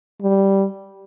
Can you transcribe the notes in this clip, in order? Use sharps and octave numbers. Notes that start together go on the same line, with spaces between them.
G3